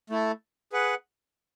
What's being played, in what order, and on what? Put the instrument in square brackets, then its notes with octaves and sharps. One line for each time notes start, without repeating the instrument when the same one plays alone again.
[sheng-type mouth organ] A3 E4 A4
G#4 B4 F#5